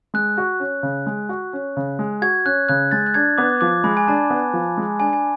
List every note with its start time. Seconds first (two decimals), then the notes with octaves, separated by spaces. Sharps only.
0.14 G#3 F#6
0.38 F#4
0.60 C#4
0.83 C#3
1.06 G#3
1.29 F#4
1.53 C#4
1.77 C#3
1.99 G#3
2.22 F#4 G#6
2.46 C#4 F#6
2.68 C#3 F#6
2.91 G#3 A6
3.06 F#6
3.14 D4 G#6
3.38 B3 D6
3.61 F3 D6
3.84 G#3 B5
3.97 G#5
4.08 D4 A5
4.30 B3
4.54 F3
4.78 G#3
4.99 D4 G#5
5.13 G#5